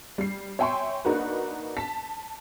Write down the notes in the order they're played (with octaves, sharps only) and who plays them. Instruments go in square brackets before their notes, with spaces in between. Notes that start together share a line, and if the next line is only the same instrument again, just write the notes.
[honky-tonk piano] G3 C7
C#5 E5 G5 G#5 C6 C#6
A#3 D4 D#4 F#4 A#4 B4
A5 B6